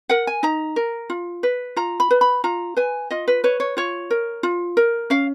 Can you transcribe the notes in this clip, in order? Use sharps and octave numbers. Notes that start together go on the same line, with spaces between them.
A#4 F#5
G#5
D#4 A#5
A#4
F4
B4
F4 A#5
B5
B4
B5
F4 A#5
B4 G#5
F4 D#5
B4
B4 C#5
C#5
F4 C#5
A#4
F4
A#4
C#4 F5